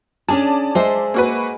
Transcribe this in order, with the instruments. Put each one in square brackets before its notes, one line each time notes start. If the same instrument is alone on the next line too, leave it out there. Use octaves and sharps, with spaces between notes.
[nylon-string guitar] C#4 D4 G#4 [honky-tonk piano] D5 A5
[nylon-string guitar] G#3 C5 E5
[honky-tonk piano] A#3 F#4 B4